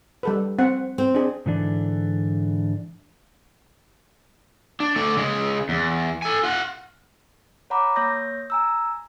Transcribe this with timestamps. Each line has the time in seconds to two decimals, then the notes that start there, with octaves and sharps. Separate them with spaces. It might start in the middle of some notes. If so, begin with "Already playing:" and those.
0.23 G3 A4 B4
0.59 C4 F#5
0.98 C4
1.15 D4 G#4
1.46 G#2 D3 E3 D4
4.80 D4
4.96 A3 D5
5.17 C#3 G#3
5.69 E2
6.22 A4 G#5
6.43 F4 F#5
7.70 C#5 F#5 A#5 B5 D6
7.96 A#3 C#5 D#6 G6 A#6
8.50 G#5 A#5 E6